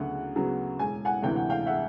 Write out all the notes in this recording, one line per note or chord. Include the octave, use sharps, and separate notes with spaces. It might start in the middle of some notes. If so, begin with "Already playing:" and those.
Already playing: D2 C#3 F#3 B3 F#5
C#3 F#3 B3
E1 G#5
F#5 G#5
D2 C3 E3 G5
F#5
F5 G5
E5 F#5